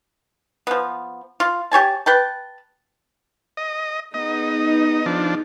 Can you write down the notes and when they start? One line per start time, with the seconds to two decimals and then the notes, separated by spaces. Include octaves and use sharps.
0.67 F3 B3
1.40 F4
1.71 G4 C#5 G#5 A5
2.06 B4 G5 A5
3.57 D#5
4.14 B3 D#4 G#4 D#5
5.06 F3 D4